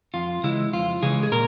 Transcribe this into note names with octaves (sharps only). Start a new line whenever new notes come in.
F2 F4
C#3 E3 G#3 E4
F2 F4
C#3 E3 G#3 G#4
G#4
A#2 A#4